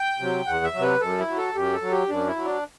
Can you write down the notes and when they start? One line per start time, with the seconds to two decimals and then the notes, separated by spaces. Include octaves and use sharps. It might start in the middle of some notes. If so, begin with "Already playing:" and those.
Already playing: G5
0.19 C3 F#3
0.46 E2 F#5
0.64 E5
0.73 F#3
0.79 C3 B4
1.01 F#2 A4
1.19 E4
1.28 F#3
1.38 A4
1.55 F#2 G4
1.73 A4
1.82 F#3
1.91 G4
2.09 F#2 D4
2.27 E4
2.36 F#3
2.45 D4